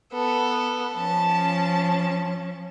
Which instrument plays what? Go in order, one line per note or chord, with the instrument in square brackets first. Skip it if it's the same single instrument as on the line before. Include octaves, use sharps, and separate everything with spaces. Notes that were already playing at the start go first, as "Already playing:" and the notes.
[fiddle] B3 A4
[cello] F3 C#4 [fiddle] A5